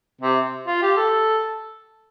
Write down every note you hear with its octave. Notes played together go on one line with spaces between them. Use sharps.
C3
F4
G4
A4